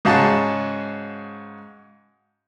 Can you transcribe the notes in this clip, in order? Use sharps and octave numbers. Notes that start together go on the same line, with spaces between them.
G#2 C#3 F#4 A5